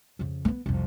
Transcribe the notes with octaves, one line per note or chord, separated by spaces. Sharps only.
F2 C#3
A3 B3
C2 F2